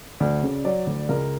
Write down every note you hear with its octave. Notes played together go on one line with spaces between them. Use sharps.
D2 D5
C#3
F#3 D5
D2
C#2 A#4